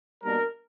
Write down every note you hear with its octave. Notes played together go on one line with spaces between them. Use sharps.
B2 G3 A#3 D4 A#4